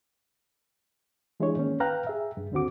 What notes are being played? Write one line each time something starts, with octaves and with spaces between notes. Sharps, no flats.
E3 G#3 D4 E4 G#4 C#5
D#3 A#3 C#4
B4 F5 G5 A#5 F6 F#6
G#4 E5
G2
D#2 D3 C4 F#4 D6